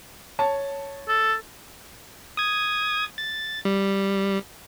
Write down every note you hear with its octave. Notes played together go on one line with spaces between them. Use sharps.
C#5 A5
A4
D#6 G#6
A6
G3